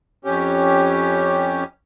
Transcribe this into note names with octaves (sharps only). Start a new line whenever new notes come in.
F2 C#4 G4